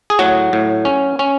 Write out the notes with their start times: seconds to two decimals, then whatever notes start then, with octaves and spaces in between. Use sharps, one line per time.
0.10 G#4
0.19 A2 F#3 F#4
0.53 A2
0.85 C#4
1.19 C#4